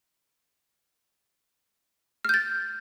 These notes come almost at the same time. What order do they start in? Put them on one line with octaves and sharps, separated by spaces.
F6 G6 A6